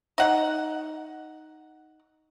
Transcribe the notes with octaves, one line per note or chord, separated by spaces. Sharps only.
D#4 F#5